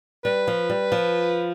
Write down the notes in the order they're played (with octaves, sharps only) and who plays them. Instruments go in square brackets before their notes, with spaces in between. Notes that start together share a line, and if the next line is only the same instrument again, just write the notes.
[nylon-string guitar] G3 [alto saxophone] B4
[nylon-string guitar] F3
G3
F3